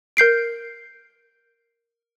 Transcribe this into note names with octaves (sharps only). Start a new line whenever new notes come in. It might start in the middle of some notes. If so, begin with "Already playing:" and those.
A#4 G6 C7 D7